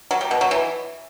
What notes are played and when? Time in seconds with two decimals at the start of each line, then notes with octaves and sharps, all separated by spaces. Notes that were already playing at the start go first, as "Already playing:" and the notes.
0.11 F#3
0.21 G3
0.31 B2
0.41 F#3
0.51 E3